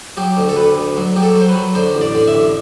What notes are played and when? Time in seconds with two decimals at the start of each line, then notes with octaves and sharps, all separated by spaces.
0.17 F#3 G4
0.37 D2
0.49 A4
0.56 D2 B4
0.77 D2
0.97 F#3
1.16 F#3 G4
1.23 A4
1.36 F#3 C5
1.49 B4
1.55 F#3
1.75 D3 C5
1.95 A1
2.01 D5
2.15 D3
2.28 E5
2.35 A1